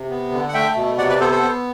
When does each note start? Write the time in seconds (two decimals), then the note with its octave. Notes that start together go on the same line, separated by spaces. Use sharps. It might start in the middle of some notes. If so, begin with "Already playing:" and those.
Already playing: C3
0.10 B3
0.32 D3
0.49 F#5
0.54 A3 E5 G5
0.76 B2
0.98 C3 D5 F#5
1.09 B4 D5
1.20 B3 A4 C5
1.31 A4 C5
1.42 B3